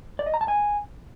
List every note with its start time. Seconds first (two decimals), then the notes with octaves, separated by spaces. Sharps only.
0.19 D5
0.26 D#5
0.34 A#5
0.41 A5
0.48 G#5